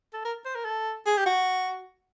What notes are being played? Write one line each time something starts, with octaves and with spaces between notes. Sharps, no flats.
A4
A#4
C5
A#4
A4
G#4
G4
F#4